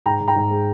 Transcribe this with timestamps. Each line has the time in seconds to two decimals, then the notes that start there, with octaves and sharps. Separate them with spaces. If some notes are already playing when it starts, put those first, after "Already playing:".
0.06 G#2 G5 A#5
0.20 G#2
0.28 G5 A#5
0.36 G#2
0.50 G#3